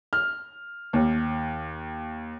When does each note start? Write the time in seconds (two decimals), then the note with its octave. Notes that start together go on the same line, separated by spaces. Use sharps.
0.13 F6
0.93 D#2